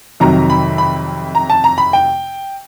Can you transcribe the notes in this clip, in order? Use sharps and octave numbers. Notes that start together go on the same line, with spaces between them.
F2 C3 D#3 F#3 A#5
B5
B5
A#5
A5
A#5
B5
G5